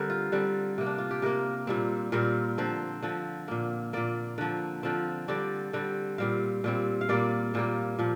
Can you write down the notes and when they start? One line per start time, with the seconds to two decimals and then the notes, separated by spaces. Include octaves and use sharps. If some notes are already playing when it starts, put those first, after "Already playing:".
Already playing: D3 G3 C4 A#4
0.10 F4
0.32 D3 G3 C4
0.78 C3 A#3
0.86 D4
0.98 F4
1.11 G4
1.22 C3 A#3 A#4
1.67 A#2 G3 C4
2.12 A#2 G3 C4 A#4
2.58 D3 F3 C4 C5
3.02 D3 F3 C4
3.48 A#2 A#3
3.93 A#2 A#3 D5
4.38 D3 F3 C4
4.83 D3 F3 C4
5.28 D3 G3 C4 D5
5.73 D3 G3 C4
6.18 A#2 G3 C4 F5
6.64 A#2 G3 C4
7.01 F5
7.09 A#2 G3 A#3 D5
7.54 A#2 G3 A#3 C5
7.99 A#2 F3